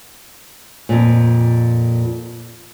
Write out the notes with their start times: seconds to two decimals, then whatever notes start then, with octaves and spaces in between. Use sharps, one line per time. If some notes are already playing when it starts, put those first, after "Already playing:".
0.89 F2 A#2